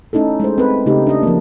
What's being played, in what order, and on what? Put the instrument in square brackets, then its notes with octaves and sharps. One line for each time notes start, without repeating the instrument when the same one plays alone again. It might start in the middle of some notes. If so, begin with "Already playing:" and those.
[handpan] A3 C#4 D#4 E4 A4
G#3 A3 C5
C4 B4
C#3 A3 D#4 G4
D4 D#5
F3 A#3